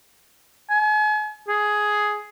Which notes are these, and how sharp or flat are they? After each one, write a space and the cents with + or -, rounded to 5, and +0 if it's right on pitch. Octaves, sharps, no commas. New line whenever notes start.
G#5 +40
G#4 +10